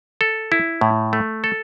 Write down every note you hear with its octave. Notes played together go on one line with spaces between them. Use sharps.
A4
E4
A2
A3
A4